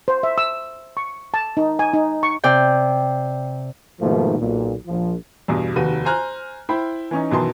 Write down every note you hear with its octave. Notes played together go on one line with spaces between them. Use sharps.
C5
E5
E6
C#6
A5
D#4
G#5
D#4
C#6
C3 D5 G5
G#2 B2 D#3 F3 A3 A#3
B1 A#2
A#1 F3
E2 G2 B2
F1 D#2 F#4 B4 D#7
C5 G#5 A#5 F6 F#6
E4 C5 G5 B5
E3 C#4 D#4
F#2 B2 D#3 E3 A5 C6